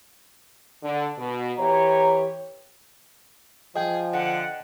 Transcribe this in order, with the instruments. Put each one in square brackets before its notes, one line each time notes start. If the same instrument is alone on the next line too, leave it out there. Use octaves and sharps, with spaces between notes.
[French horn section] D3
B2
[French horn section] E3 G4 C#5 [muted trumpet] A#5
[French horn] F3 [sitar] G#4 [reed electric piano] D#5 G5
[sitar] D3 [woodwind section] F#5